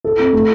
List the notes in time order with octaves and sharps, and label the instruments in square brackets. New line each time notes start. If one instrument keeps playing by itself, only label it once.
[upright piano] A4
C4
A3